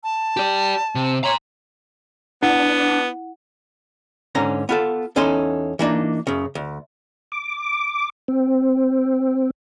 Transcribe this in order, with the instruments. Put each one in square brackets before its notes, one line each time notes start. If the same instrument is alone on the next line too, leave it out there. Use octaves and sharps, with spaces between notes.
[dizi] A5
[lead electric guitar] G4 D5
C3
[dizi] C#5 [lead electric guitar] A#5 C6
[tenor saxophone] B3 [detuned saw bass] D4 [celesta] E4 F#5
[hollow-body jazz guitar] G#2 D3 C#4 A#5
B3 F4 A4
E2 C#4 D#4 A4 C6
E3 A#3 D4 D#4
F#2 C#3
D2
[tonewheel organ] D6
C4